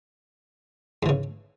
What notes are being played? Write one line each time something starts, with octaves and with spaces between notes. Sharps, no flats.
G#2 C#3 E3